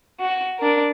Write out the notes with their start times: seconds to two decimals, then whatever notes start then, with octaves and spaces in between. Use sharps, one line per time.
0.20 F#4
0.59 D4 A#4